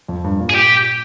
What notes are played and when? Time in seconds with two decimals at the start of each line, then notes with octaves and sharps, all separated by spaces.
0.08 F2
0.24 G2
0.40 A#2
0.50 G#4
0.55 G4